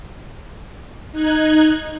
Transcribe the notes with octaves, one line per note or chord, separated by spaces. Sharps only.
D#4 F#6 G#6